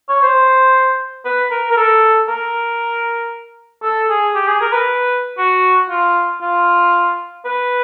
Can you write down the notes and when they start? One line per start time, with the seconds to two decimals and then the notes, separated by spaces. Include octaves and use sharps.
0.09 C#5
0.22 C5
1.25 B4
1.51 A#4
1.71 A#4
1.77 A4
2.28 A#4
3.83 A4
4.10 G#4
4.35 G4
4.48 G#4
4.61 A#4
4.73 B4
5.38 F#4
5.90 F4
6.42 F4
7.45 B4